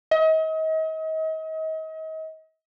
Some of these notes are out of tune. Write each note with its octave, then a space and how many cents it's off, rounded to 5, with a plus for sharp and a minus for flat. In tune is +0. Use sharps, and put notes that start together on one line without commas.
D#5 +35